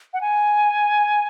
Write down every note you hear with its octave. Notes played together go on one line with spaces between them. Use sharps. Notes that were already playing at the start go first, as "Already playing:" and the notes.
F#5
G#5